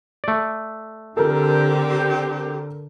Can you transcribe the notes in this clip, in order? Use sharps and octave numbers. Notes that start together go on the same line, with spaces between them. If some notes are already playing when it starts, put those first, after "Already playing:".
A3 D5
D3 C4 G4 A4 A#4